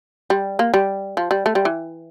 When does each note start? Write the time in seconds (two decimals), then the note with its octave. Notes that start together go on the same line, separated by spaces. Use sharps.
0.30 G3
0.59 A#3
0.74 G3
1.17 F3
1.31 G3
1.46 A3
1.55 G3
1.65 E3